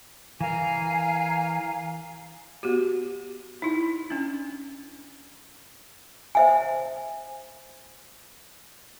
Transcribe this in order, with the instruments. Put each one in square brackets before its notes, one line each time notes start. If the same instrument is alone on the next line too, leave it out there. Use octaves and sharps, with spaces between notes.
[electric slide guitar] E3 A#4 [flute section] F5 G#5 A#5
[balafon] B3 F#4 G4
D#4 E4
C#4 D4
[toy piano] C5 E5 G#5